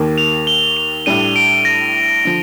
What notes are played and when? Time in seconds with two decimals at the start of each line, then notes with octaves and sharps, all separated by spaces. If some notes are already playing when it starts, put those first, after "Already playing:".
Already playing: D#2 D#3 A#3
0.18 F7
0.47 G7
0.77 F7
1.06 A2 G3 D4 D#7
1.36 D7
1.65 A#6
2.25 D3 F3